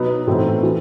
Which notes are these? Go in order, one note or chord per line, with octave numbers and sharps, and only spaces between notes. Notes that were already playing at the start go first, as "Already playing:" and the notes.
Already playing: B2 F#3 B3 D#4
A2 E3 A3 C4 D#4
E3